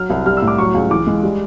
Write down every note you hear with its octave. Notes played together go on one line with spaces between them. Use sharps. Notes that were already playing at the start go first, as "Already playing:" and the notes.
Already playing: F#3 F6
C2
G3 F6
E6
A2
D6
F#3 C#6
C#2
E3 D6
G#3
G3